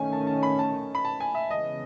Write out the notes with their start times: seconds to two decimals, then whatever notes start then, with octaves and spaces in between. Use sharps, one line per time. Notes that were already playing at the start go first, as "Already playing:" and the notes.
Already playing: D#3 A3 C#4 G#5
0.13 A5
0.27 A5
0.43 B5
0.59 A5
0.95 B5
1.05 A5
1.20 G#5
1.35 E5
1.51 C#3 E3 G#3 B3 D#5